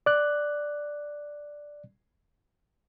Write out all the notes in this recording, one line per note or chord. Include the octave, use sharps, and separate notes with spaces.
D5 F#6